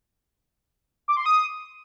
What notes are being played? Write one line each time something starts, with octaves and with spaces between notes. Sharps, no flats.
D6
C6
D#6